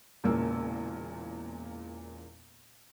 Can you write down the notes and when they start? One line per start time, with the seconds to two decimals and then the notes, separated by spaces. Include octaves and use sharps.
0.24 E1 E2 A#2 C#3 A#3 E6